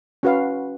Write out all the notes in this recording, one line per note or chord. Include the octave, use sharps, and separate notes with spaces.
C#4 F#4 B4 F5